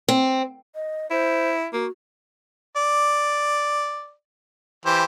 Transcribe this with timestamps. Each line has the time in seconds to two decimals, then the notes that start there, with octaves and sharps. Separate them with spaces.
0.08 C4
0.74 D#5
1.11 E4 C5
1.73 A#3 F#4
2.77 D5
4.86 E3 G4 C5